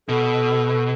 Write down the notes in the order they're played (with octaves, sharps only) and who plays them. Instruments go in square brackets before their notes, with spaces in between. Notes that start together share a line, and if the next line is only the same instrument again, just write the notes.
[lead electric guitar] B2 [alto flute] A4